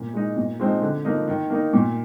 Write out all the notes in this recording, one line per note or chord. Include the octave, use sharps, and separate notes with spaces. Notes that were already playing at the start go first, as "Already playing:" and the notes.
Already playing: A#2
G#3 D#4
A#2
F3 G#3 C4 D#4
D3
F3 A#3 D#4
D#3
A#3 D#4
A#2